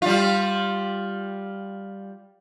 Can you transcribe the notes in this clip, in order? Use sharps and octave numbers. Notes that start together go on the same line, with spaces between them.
G3 F4